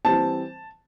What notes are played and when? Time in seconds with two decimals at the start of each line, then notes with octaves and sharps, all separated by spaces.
0.05 E3 G3 C4 A5